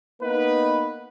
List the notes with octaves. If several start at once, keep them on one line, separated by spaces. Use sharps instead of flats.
A#3 B3 D#4 B4